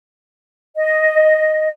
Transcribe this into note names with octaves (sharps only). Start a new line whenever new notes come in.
D#5